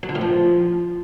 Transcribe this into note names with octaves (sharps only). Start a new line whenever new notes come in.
F#3
D3
A2
F3